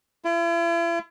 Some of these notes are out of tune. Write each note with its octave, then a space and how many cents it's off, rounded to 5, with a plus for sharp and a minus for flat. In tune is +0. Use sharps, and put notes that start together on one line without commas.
E4 +45